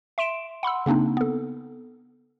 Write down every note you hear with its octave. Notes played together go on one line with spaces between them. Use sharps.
E5 C6 D7 E7
F#5 B5 C6 E6
C#3 A#3 C4 D4 D#4
B3 A4